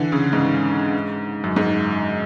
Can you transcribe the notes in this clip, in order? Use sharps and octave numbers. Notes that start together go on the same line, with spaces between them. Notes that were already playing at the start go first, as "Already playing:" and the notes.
Already playing: D3 E3
C#3
G#2
F#2
G#2